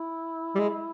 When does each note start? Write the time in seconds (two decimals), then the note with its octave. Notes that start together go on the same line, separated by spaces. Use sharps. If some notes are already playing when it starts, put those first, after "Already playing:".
Already playing: E4
0.55 G3
0.59 G#3